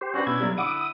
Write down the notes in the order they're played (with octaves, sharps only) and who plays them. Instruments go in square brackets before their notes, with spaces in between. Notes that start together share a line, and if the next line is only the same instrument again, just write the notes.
[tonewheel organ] G4 C5
[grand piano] C#4 D4 B4 [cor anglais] F#4
[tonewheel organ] B2 G#6 [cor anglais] E4
[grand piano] B1 F#3 G3
[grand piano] D3 F#5 [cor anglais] E4 [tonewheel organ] D6 D#6
[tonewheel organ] D#6